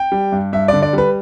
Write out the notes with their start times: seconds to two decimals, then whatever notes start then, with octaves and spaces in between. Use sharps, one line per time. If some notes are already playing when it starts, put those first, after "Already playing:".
Already playing: G5
0.12 G3
0.32 G2
0.53 G2 E5
0.68 D3 D5
0.82 D5
0.93 G3 B4